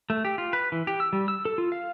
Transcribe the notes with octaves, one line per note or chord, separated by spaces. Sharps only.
A3
G4
F4
B4
E3
G4
E6
G3
E6
A4
F4
F5